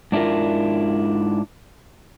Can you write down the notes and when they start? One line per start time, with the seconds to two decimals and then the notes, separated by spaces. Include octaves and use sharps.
0.12 G#2 D4 E4 F4 A#4